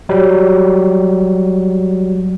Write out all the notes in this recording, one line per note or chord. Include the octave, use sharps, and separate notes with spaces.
F#3 G3